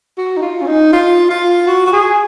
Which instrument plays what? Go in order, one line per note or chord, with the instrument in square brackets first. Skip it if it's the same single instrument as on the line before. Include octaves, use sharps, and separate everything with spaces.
[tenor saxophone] F#4
D#4
F4
C#4
D#4
F4
F4
F#4
F#4
G#4